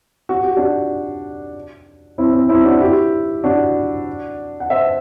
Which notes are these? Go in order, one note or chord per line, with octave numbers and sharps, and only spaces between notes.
F#4
G4
D4 F#4
C4 E4
C4
C4 E4
D4 F#4
E4 G4
D4 F#4
F#5
C5 E5